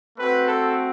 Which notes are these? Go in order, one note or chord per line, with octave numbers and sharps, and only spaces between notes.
A3 C4 F#4 B4
A4